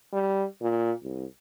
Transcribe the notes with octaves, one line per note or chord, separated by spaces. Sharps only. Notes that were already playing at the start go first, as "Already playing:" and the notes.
G3
A#2
C2